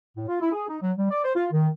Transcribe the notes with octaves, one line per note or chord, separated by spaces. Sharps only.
A2
F4
E4
G#4
D#4
F#3
G3
D5
C5
F4
D#3